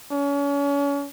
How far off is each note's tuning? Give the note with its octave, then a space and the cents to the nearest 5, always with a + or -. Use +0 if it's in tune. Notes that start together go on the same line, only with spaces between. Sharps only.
C#4 +35